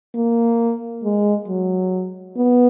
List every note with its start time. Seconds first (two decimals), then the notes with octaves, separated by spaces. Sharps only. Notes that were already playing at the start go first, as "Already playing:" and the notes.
0.16 A#3
1.04 G#3
1.48 F#3
2.37 B3